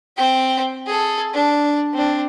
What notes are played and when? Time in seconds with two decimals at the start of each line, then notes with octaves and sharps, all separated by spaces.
0.17 C4 G5
0.86 G#4 A4
1.34 D4
1.93 C4 D4